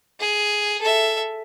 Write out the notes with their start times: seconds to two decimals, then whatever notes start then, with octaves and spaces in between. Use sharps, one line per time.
0.20 G#4
0.81 A4 E5